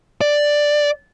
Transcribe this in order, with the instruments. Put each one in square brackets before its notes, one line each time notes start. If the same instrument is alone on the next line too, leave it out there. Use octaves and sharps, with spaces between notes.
[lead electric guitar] D5